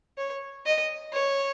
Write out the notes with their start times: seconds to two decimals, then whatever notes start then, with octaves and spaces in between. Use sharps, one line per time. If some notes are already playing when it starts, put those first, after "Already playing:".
0.18 C#5
0.66 D#5
1.13 C#5